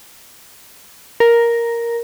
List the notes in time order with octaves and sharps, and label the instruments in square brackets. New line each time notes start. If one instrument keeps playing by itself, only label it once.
[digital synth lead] A#4